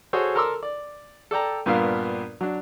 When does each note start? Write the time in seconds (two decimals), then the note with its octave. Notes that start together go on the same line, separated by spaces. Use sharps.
0.13 F#4 G#4 A4 C5 C#5
0.35 A4 A#4 A#5 C6 D6 E6
0.63 D5
1.31 A4 D5 G5 A#5
1.66 G2 A#2 B3 D4 A#4 F5
2.41 F#3 D4